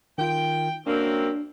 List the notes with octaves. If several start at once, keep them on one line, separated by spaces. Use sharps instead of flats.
D#3 F4 G5
F#2 A#3 C4 D4